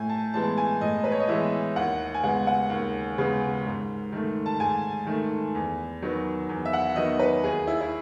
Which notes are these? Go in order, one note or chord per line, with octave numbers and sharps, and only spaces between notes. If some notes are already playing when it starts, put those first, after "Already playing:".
Already playing: A2 G#5
A5
E3 G#3 B3 A5
G#5
A2 D#5
B4
C#5
D#5
E3 G#3 B3 E5
D#2 F#5
G#5
C#3 G#3 B3 F#5
F#5
D#2
C#3 G#3 B3
G#2
D#3 A3
A5
G#2 G#5
D#3 A3
E2
D#3 F#3 B3
E2
E5
F#5
D#3 F#3 B3 D#5
B4
D#2 G#4
E4
E4